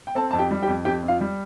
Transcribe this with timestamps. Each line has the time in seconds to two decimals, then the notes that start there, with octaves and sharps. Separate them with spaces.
0.07 G5
0.15 C4 A4 A5
0.31 F2 A5
0.38 G4 G5
0.51 G3
0.62 G4 G5
0.67 F2
0.85 F2 G4 G5
1.03 F2
1.08 F4 F5
1.21 G3